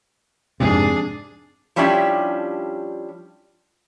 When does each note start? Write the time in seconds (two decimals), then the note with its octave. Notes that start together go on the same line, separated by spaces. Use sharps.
0.60 F2 G#2 C3 D4 G#4
1.76 F3 G3 C#4 D4 E4 G4